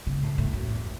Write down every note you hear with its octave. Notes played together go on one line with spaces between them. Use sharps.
C#3
A2
A2
F#2
E2